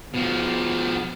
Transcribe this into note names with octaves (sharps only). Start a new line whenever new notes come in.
B2 F3